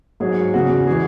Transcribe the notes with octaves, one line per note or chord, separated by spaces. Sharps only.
G#2 F#3 G#4
E2 C#3 G#3 F#4
E3 G#3 G#4